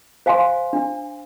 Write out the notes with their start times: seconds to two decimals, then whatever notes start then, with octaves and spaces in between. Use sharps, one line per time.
0.26 C5 F5 G#5 C6
0.73 D4